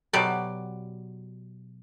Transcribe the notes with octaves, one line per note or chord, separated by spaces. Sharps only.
B2 F#3 G4 D5